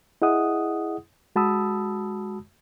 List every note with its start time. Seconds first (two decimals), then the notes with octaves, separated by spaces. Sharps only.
0.22 E4 G#4 D#5 F#5 D#6
1.36 G#3 F#4 A5 B5 D#6 E6